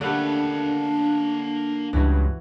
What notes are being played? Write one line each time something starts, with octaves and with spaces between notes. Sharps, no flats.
D3 G3 A3 A#3 D4 F#5
C#2 G2 E3 F#4